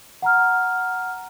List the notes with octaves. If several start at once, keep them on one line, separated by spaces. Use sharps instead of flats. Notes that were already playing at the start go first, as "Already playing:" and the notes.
F#5 A#5 F6